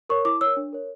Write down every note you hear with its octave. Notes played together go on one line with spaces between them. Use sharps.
A#4 C#5 C#6
E4 D6
A#4 C#5 E6
D4
A#4 C#5